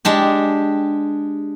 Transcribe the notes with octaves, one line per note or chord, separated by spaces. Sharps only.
G#3 D4 G4